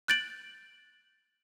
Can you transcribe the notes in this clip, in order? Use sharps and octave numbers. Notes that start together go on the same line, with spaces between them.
F#6 G6 A6 D7 F#7